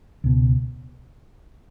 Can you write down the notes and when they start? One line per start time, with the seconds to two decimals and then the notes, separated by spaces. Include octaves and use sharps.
0.24 C#2 B2